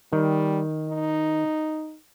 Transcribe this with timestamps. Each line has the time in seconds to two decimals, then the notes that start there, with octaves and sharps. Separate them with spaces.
0.13 D#3 G3
0.90 D#4